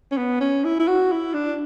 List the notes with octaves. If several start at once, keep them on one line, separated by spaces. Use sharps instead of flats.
C#4
B3
C#4
E4
E4
F#4
E4
D4